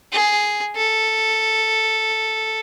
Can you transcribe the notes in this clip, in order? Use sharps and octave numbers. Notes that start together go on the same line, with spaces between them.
G#4
A4